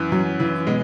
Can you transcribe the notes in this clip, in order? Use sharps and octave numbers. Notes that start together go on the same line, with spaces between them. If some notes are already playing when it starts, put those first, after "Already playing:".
Already playing: F#2 E3
F#2 F#3
C#3 E3
B2 G#3